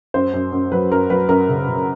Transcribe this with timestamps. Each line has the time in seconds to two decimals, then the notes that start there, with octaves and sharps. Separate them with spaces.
0.14 F#2 C5
0.34 F#2
0.52 F#2
0.72 F#3 B4
0.91 F#2 A#4
1.10 F#3 B4
1.29 F#2 A#4
1.49 C#3
1.68 C#3